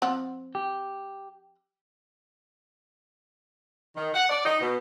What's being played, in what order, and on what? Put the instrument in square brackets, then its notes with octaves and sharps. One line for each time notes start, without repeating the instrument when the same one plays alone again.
[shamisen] F3 C4 F#5
[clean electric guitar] G4
[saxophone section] D#3
F#5
D5
D#4
B2